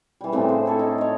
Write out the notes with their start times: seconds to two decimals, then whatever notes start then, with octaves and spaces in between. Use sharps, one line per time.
0.21 E3 G3
0.32 A2 C#3 C4 D4
0.49 C5
0.66 E4 A4 C#5
0.79 D#4 A5
0.98 C#5 D#5